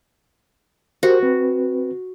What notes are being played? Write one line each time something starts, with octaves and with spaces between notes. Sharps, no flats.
F#4 G4 A#4 C5
C4 B4